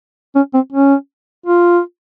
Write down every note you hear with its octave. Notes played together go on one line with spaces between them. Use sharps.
C#4
C4
C#4
F4